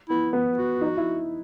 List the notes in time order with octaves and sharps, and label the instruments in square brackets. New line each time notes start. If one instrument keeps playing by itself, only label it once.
[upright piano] B3 [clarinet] E4
[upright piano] B3
[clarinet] F#4
[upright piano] D#4
E4